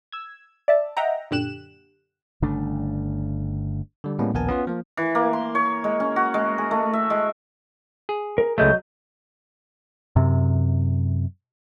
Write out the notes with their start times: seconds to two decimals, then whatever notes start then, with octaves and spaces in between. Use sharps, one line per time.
0.12 E6 G#6
0.68 D5 E5 A5
0.97 D#5 E5 F#5 G5 A#5
1.31 F#2 A#2 D3 G4 F#6 E7
2.42 G1 C#3 A3 D4
4.04 D3 G3
4.19 A2 G3 G#3 A#3 B3 C#4
4.34 A#1 D#2 B3 A#4 G#5 A5
4.49 B3 C#4 F4 B4
4.67 F3 A#3
4.97 E3
5.15 A#3
5.33 C6
5.55 C#5
5.84 G#3
6.00 C#4
6.16 F#4
6.34 G#3
6.58 G#4
6.71 A3
6.93 E5
7.10 G#3
8.09 G#4
8.38 A#4
8.58 C#2 F#3 G#3 A3 D#5 G6
10.16 F#2 C3